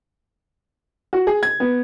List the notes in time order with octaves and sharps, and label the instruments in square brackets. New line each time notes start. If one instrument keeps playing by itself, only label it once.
[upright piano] F#4
G#4
G#6
B3